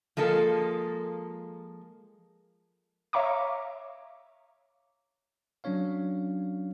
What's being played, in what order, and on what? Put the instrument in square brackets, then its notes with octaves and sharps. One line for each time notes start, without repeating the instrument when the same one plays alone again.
[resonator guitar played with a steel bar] F3 G#3 A#3 A4
[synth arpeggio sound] C#5 E5 F5 A#5 C#6 D6
[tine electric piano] F#3 C#4 D4 C#5 F5